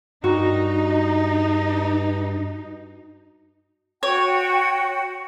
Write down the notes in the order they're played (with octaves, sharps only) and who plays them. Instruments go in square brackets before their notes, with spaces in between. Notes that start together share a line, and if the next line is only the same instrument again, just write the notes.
[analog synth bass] G2 [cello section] D#4 [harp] F#4 A#4
[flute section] F#4 G5 [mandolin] C#5